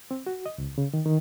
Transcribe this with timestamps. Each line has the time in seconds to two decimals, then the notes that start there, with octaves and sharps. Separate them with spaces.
0.11 C4
0.26 F#4
0.46 D#5
0.58 C#2
0.78 C#3
0.94 D#3
1.06 D#3